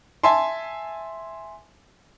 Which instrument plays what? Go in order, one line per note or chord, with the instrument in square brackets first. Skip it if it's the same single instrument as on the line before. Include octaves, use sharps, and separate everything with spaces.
[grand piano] E5 G#5 A5 C6